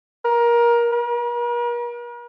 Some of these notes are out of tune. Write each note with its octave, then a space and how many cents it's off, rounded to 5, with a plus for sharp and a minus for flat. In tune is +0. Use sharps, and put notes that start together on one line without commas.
A#4 +20
A#4 +45